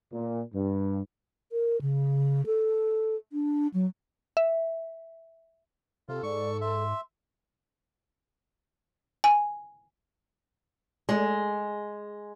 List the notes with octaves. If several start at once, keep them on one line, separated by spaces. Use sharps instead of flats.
A#2
G2
A#4
C#3
A4
D4
F#3
E5
C3 F4 A4
G#2 D5 C#6
E5 C6
G#5
G#3